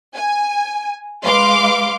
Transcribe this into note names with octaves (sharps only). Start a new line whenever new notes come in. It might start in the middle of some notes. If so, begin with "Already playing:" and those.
G#5
G#3 B4 F5 C6 D6